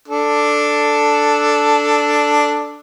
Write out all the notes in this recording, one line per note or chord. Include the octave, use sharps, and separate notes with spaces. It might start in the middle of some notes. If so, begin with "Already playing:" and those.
D4 A4